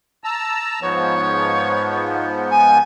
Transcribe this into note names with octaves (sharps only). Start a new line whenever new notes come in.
A5 A#5 E6
G#2 F3 B3 C#5
G#5